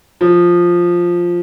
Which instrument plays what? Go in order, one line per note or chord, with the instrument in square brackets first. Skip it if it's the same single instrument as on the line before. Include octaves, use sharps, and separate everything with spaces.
[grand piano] F3